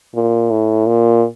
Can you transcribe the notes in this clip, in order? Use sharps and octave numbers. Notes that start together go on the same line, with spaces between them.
A#2
A2
A#2